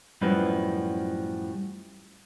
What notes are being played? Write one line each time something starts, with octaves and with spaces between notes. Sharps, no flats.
F#2 A2 F3 G3 B4